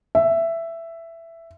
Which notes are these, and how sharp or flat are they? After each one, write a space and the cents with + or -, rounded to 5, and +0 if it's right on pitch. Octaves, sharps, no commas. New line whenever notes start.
E5 +10